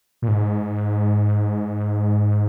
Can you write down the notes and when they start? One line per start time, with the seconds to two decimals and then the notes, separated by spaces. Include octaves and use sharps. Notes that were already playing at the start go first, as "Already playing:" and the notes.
0.22 A#2
0.28 G#2